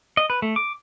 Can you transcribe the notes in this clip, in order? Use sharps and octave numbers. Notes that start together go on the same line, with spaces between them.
D#5
B4
A3
D6